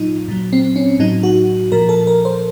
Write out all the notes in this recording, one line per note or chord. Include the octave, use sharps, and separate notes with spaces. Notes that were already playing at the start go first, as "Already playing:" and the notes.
Already playing: A#2 F#3 D#4 F4
A#2 F#3
C4
C#4
A2 F#3 D#4
F#4
A#2 F3 A#4
A4
A#4
C5